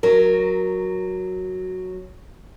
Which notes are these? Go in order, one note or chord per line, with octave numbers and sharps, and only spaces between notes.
F#3 A#4